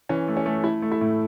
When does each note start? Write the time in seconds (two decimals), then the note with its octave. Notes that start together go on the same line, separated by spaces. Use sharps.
0.09 E3 C#4
0.28 A3
0.37 C#4
0.46 A3
0.64 A3 E4
0.82 A3
0.92 E4
1.01 A2